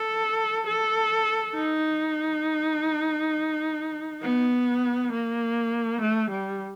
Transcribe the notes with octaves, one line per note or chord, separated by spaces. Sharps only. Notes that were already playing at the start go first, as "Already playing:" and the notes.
Already playing: A4
A4
D#4
B3
A#3
A3
G3